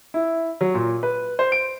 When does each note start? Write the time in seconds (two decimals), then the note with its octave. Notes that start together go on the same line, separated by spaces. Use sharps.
0.14 E4
0.61 F#3
0.74 A#2
1.03 B4
1.39 C5
1.52 D7